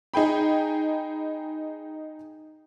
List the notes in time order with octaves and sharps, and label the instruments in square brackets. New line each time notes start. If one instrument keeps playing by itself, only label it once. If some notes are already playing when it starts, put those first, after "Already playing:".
[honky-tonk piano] D#4 G#4 G5 B5